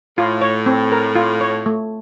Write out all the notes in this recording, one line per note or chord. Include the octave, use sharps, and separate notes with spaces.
A2 F4
C#5
C4
A#4
F4
C#5
A3